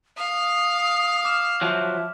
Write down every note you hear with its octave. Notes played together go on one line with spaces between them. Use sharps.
F5 D#6
D6 F6 E7
F3 F#3 E5